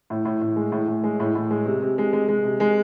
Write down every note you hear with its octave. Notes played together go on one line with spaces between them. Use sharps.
A2
A2
A2
G#3
A2
A2
G#3
A2
A2
G#3
C3
C3
G#3
G#3
G#3
C3
G#3